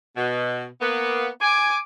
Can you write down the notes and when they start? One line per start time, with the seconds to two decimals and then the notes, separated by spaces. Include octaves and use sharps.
0.16 B2
0.81 A#3 B3
1.42 G#5 D6